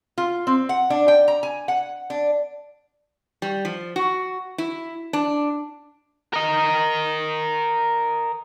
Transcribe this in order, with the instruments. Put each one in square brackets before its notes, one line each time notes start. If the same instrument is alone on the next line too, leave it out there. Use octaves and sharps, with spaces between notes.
[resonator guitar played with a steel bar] F4
C4
F#5
D4
G5
A#5
G#5
F#5
D4
G3
F3
F#4
E4
D4
[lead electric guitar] A#4 D#5